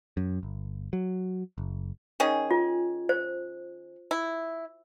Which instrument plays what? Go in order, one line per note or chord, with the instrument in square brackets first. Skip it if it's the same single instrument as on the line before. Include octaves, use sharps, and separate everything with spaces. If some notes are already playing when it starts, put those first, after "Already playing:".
[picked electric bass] F#2
G1
F#3
F#1
[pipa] D#3 C#4 G#4
[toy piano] F4
C5
[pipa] E4